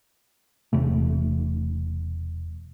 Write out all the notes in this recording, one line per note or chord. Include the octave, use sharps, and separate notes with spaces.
E1 C3 A3